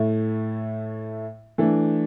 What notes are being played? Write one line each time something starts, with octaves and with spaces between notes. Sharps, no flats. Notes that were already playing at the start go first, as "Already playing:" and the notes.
Already playing: A2 A3 E4
E3 A3 D4